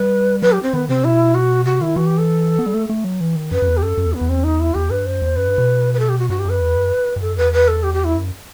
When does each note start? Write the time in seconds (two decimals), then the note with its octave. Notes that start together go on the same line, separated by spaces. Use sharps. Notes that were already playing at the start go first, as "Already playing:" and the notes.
Already playing: G3 B4
0.42 F#3 B4
0.52 G4
0.63 C4
0.73 D#3 B3
0.89 C3 C4
1.04 B2 E4
1.35 F#4
1.65 C3 F#4
1.81 D#3 E4
1.96 E3 F#4
2.06 G4
2.18 A4
2.59 B3
2.66 G3
2.74 A3
2.90 A3
3.04 F#3
3.21 E3
3.36 D#3
3.51 F#2 B4
3.62 F#2
3.67 E2
3.77 G4
3.83 F#2 A4
3.97 F#2
4.05 E2
4.14 B3
4.21 E2
4.29 C4
4.44 D#4
4.60 E4
4.74 E2 G4
4.90 G2 B4
5.06 F#2 C5
5.22 E2
5.36 F#2 B4
5.47 G2
5.58 B2
5.94 B4
5.99 A4
6.09 G4
6.19 F#4
6.29 G2 F#4
6.39 G4
6.45 F#2 B4
6.61 E2
6.76 F#2
7.16 G2
7.22 F#2 A4
7.37 E2 B4
7.53 B4
7.68 A4
7.83 G4
7.94 G4
8.04 E4
8.15 F#2